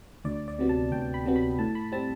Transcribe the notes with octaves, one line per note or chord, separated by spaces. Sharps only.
D2 D5
D5
C3 F#3 B3
A5
D2 G5
B5
C3 F#3 B3
B5
A2 A5
B5
G3 C4 A5